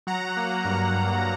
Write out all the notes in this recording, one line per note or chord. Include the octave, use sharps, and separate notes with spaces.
F#3 F#5 A#5
A#3
G2
G2